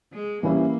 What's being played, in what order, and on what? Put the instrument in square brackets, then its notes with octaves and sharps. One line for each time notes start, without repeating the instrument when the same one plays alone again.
[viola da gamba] G#3
[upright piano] E3 G3 C#4 E4 [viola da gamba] A#3